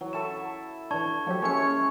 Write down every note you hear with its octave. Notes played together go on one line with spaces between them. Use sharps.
E3 F#3
E4 A4 C#6 E7
E3 D4 C#5 A5 C#6 G#6
F3 F#3 G4 A4
G#3 A#3 C#4 C#5 E5 C#7